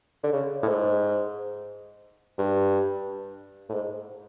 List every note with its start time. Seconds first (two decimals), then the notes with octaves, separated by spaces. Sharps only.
0.24 D3
0.33 C#3
0.63 A2
0.68 G#2
2.38 G2
3.69 A2
3.74 G#2